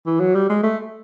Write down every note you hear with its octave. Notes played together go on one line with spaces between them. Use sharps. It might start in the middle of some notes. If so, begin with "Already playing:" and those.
E3
F#3
G3
G#3
A3